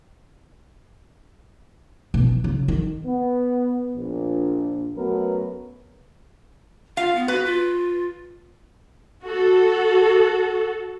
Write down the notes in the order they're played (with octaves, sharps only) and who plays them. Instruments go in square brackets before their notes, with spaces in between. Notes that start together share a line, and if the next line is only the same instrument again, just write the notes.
[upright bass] B2
E3
C#3
D#3
[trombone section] B3
A#1
F#2 F#3 A3 B3 A#4 B4
[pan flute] F4 [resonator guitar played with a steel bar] F5
[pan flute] B3
[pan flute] F#4 [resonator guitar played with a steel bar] B4
[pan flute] F4
[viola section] F#4 A4